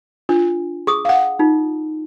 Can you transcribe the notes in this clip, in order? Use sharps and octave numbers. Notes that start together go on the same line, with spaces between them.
D4 F4
G#4 C#6 D#6
F5 F#5
D#4 F4